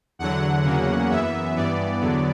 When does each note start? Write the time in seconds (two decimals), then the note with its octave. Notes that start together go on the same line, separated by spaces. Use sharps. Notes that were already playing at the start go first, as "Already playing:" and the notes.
0.19 E2 D3 F#3 F#5
0.65 E2 C#3 F#3 A#3 C#4
1.10 F#2 E3 B3 E5
1.56 G2 E3 B3 D5
2.01 E2 D3 F#3 B3